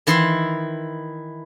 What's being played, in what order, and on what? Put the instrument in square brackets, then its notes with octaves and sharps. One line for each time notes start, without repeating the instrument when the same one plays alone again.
[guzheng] D#3 E3 E4 C6